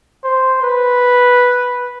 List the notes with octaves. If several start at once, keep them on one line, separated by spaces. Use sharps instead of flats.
C5
B4